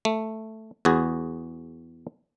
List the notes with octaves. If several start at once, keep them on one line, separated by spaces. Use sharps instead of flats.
A3
E2 F#4 G#4